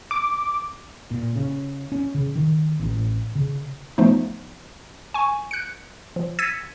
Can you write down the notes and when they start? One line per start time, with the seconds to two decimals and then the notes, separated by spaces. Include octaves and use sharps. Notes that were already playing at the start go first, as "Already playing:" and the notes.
0.11 D6
1.11 A#2
1.36 C#3
1.92 C#4
2.15 C#3
2.36 D#3
2.80 A1
3.35 C#3
3.98 F3 A3 B3 D#4
5.14 G#5 C#6
5.51 F#6 C#7
6.16 F3
6.39 E6 G#6 A6 B6 C#7 D#7